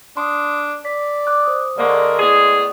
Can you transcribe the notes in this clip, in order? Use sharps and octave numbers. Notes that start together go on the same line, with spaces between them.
D4 C6 D#6
D5 B6
D6 F#6
C5 D#6
D3 G#3 A#3 D5 C#6
A2 B3 G#4